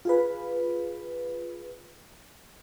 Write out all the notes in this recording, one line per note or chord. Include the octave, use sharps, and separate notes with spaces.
F4 G#4 B4